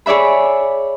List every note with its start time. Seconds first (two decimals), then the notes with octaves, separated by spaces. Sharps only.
0.06 G#4 C#5 D5 E5 B5